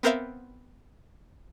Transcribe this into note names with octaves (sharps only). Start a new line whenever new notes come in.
B3 C4 A#4 C5 E5 F5